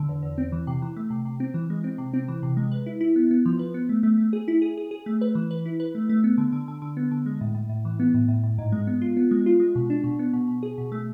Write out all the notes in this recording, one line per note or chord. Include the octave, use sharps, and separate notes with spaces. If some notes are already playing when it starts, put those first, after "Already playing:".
Already playing: D3
E2
E2
C4
E3
C3
E3
A3
C3
C3
C4
E3
G#3
C4
C3
C4
E3
C3
G#3
B4
E4
E4
B3
B3
F3
B4
B3
A3
A3
A3
G#4
E4
G#4
G#4
G#4
A3
B4
E3
B4
E4
B4
A3
A3
B3
D3
D3
D3
D3
B3
D3
G#3
A2
A2
A2
E3
B3
A2
A2
A2
G#2
G#3
B3
F4
B3
G#3
F4
G#3
B2
D4
B2
B3
B2
B2
G#4
B2
A3